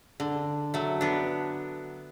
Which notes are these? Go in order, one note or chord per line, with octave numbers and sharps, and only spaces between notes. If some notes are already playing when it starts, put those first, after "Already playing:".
D3
F#3 A3
B3 D4